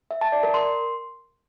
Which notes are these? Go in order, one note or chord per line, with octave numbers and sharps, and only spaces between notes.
E5
A5
D5
A#4
C6